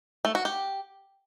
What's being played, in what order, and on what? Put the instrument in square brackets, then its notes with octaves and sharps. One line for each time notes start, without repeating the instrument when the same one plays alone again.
[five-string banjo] A3
F#4
G4